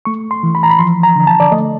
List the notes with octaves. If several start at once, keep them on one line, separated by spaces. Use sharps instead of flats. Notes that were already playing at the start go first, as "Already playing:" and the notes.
A3 C#6
C6
E3
B5
A#5
B5
F3 C6
A#5
D3
A5
D5
A3 D#5